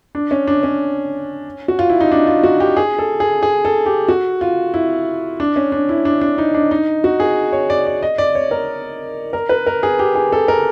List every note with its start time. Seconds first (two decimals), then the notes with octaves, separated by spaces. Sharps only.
0.15 D4
0.31 C#4
0.47 D4
0.63 C#4
1.68 F#4
1.79 F4
1.90 E4
2.00 D#4
2.12 D4
2.27 F4
2.44 F#4
2.60 G4
2.77 G#4
2.99 A4
3.20 G#4
3.43 G#4
3.65 A4
3.86 G4
4.08 F#4
4.41 F4
4.74 E4
5.40 D4
5.56 C#4
5.72 D4
5.89 E4
6.05 D4
6.21 D4
6.38 D#4
6.54 D4
6.71 D#4
7.04 F#4
7.20 G#4
7.53 C#5
7.70 D5
7.86 D5
8.03 D#5
8.18 D5
8.35 C#5
8.51 A#4
9.33 A#4
9.49 B4
9.67 A#4
9.83 G#4
9.99 G4
10.15 G#4
10.32 A4
10.48 A#4